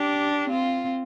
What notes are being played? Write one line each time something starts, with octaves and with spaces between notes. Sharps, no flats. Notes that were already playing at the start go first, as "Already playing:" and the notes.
Already playing: D4 G4
C4 F4